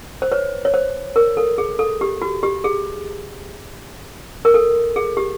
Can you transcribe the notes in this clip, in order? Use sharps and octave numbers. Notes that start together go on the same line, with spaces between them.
C5
B4 C#5
C#5
C5
A#4
A4
G#4
A4
G4
F#4
G4
G#4
A#4
A4
G#4
G4